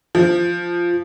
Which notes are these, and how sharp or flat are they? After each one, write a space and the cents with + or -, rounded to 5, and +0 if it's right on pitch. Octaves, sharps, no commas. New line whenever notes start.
F3 -5